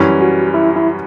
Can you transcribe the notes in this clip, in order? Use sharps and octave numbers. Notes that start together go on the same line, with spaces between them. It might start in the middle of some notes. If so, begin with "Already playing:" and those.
Already playing: F#2 E3 G3 C#4
F#4
E4
E4